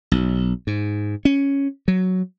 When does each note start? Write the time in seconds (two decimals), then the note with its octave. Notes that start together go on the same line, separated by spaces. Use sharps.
0.12 B1
0.67 G#2
1.25 C#4
1.88 F#3